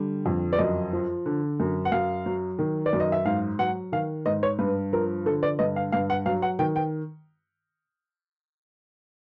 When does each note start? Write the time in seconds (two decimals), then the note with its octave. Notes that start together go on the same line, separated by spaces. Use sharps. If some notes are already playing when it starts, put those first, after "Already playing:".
Already playing: D3 G3
0.26 F2
0.53 D5
0.58 F#2 D#5
0.93 F3
1.26 D3
1.60 F#2
1.85 F#5
1.92 F#2 F5
2.26 F#3
2.59 D#3
2.86 D5
2.93 F#2
3.00 D#5
3.12 E5
3.25 G#2 F5
3.59 F#3 F#5
3.92 D#3 F5
4.26 G#2 D#5
4.43 C#5
4.59 G2 B4
4.93 F3 A#4
5.26 D3 A4
5.43 D5
5.59 G2 D#5
5.76 F5
5.92 G2 F5
6.10 F#5
6.26 F#3 F5
6.42 F#5
6.59 D#3 G5
6.76 G5